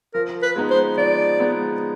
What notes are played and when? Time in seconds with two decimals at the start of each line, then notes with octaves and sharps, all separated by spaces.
0.14 F3 A#4
0.42 B4
0.56 G#3 B3 D#4
0.71 C5
0.98 F3 D5
1.39 G#3 B3 D#4